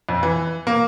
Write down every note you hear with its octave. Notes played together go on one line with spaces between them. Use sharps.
F2
E3
A#3